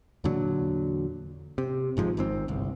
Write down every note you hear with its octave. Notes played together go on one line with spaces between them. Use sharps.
E2 A#2 D3 F#3
C3
G#1 G#2 F3 G#3
G#1 G#2 C4
G1 C2